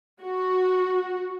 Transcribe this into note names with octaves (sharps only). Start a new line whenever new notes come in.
F#4